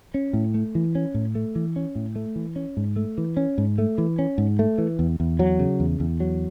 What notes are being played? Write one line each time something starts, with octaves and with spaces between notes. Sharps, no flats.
C#4
A2
A3
E3
C#4
A2
A3
E3
C#4
A2
A3
E3
C#4
G#2
A3
E3
C#4
G#2
A3
E3
C#4
G#2
A3
E3
E2
E2
F#3
C#3
E2
E2
F#3